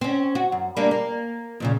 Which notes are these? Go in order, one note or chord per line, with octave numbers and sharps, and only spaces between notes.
C4 C#4
F#4
F#2
G3 A#3 D4
A#3
F2 A#2 C#3